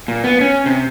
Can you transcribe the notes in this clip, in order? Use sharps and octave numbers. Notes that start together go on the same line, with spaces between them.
A#2
B3
C#4
C3